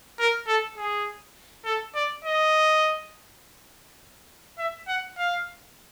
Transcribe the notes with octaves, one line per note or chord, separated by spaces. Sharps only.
A#4
A4
G#4
A4
D5
D#5
E5
F#5
F5